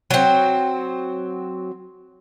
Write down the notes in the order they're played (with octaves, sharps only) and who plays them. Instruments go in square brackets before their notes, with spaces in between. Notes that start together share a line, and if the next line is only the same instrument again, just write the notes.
[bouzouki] F#3 C4